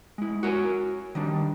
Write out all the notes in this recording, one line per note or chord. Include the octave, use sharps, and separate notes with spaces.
G#3 E4
F#4 A#4 C#5 G#5
D#3 G3 D4